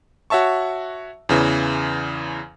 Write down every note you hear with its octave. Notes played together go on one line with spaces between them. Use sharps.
F#4 C#5 E5 A5 C#6
E2 C#3 E3